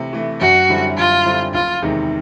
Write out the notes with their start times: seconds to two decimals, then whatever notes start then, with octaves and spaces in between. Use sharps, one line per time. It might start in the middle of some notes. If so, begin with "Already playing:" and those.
Already playing: C3 E3 A3
0.13 E3 A3
0.40 F#2 F#4
0.69 D3 G3 C4 E4
0.97 F#2 F4
1.25 D3 G3 C4 E4
1.54 F#1 F4
1.82 E2 C3 D#3 G#3